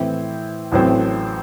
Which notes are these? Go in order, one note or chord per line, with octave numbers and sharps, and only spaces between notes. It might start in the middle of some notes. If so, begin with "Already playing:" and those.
Already playing: A2 E3 C4 E4
A1 A2 F#3 C4